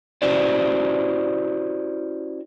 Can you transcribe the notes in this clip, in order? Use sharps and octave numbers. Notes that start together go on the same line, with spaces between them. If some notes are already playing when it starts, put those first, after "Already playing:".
C#4 E4 F#4 G4 C5 D5